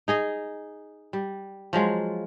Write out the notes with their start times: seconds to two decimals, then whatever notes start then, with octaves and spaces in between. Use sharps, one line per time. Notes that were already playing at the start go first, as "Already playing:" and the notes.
0.08 D#4 G#4 D#5
1.13 G3
1.73 F3 F#3 G#3 F4